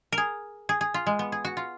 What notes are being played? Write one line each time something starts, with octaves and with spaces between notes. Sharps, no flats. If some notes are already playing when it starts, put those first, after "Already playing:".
A#4
G#4
G#4
G#4
F4
G#3
B3
G#4
F#4
F4